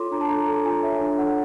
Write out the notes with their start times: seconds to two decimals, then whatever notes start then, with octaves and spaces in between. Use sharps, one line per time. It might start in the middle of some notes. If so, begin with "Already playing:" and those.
Already playing: F4 A4 C#5 C6 D6
0.11 D4 A#5
0.21 A5
0.29 A4 A#5
0.47 A4 A#5
0.65 F4 G#5
0.83 C#5 E5
1.01 D4
1.18 A4 F#5